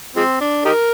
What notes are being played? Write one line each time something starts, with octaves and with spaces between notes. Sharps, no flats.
F3 G#3 C4
D4
D#4 G4 A#4